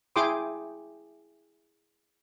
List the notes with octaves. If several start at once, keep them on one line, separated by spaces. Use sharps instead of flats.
E4 G#4 G5 C6 D6 D#6